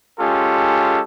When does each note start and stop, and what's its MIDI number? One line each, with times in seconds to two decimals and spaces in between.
0.20 1.01 56
0.20 1.01 61
0.20 1.01 65
0.20 1.01 67
0.20 1.01 69